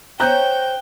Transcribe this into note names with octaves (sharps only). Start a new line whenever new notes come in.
C#4 C5 C#5 F#5 G5 A#5 F#6 G6